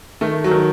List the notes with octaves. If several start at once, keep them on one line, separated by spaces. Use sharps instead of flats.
D#3 A3
F#3
D#3